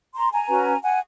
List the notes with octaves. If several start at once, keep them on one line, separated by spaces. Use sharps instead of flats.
A#5 C6
G#5 A#5
C#4 F#4 B4
F#5 G#5